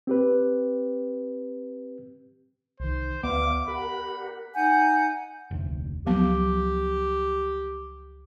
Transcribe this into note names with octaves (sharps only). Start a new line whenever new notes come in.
C4 G4 B4
C2 D#3 C5
D2 B3 D5 E5 F5 D6
G4 A#4 F#5 B5
D#4 F#5 G#5 G6
F1 D2
C#2 F3 F#3 B3 G4